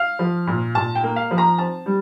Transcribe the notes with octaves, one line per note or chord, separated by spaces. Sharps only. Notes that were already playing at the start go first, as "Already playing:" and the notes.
Already playing: F5
F3
A#2
A#2 A5
G5
A#3
F5
F3
A#5
C4 A5
G3